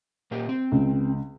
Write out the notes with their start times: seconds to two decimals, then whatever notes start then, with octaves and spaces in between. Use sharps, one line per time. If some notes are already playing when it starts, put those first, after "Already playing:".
0.31 A#2 A#3 G4
0.49 C4
0.72 C#2